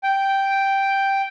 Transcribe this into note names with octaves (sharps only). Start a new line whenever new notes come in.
G5